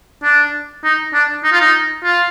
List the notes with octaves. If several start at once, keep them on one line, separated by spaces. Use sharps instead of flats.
D4
D#4
D4
D#4
F4
D#4
F4